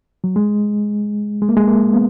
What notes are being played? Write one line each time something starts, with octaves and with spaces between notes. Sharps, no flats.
F#3
G#3
G#3
A#3
G#3
A#3
B3